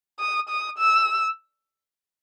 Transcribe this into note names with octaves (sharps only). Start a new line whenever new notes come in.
D#6
D#6
E6